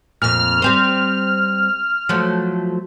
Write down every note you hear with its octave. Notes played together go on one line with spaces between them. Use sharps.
F2 A#2 F6
G3 C4 C5
F3 F#3 A3